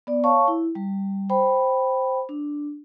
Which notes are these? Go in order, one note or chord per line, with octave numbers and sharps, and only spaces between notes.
B3 D5
C#5 F5 A5 C#6
E4
G3
C5 G5 B5
D4